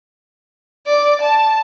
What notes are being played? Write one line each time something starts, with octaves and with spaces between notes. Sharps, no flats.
D5
A5